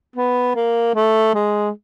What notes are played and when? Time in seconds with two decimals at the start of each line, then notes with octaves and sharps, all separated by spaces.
0.16 B3
0.55 A#3
0.95 A3
1.34 G#3